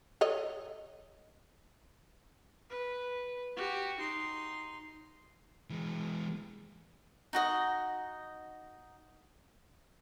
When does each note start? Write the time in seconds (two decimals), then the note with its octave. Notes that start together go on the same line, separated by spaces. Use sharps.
0.21 A4 C#5 D#5
2.70 B4
3.56 F#4 G4
3.99 D#4 C6
5.70 E3 G#3
7.33 D#4 F#4 D#5